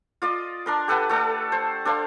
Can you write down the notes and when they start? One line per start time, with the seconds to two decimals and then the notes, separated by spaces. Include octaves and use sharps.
0.22 F4 D5 D#5
0.66 D4 A#4 C6
0.88 G4 A4 B4 F#5
1.09 A3 A4 D5
1.52 C5
1.85 D4 A4 C5 F5